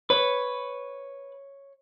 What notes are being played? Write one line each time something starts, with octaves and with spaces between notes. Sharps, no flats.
B4 C#5